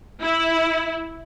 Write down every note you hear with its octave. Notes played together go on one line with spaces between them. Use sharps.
E4